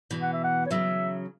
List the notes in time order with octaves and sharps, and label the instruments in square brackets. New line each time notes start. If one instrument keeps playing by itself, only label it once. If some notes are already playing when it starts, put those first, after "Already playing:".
[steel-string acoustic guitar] B2 E3
[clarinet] F#5
E5
F#5
C#5
[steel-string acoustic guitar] C#3 F#3 [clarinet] E5